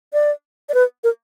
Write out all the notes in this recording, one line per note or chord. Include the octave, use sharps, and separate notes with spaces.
D5
D5
B4
A#4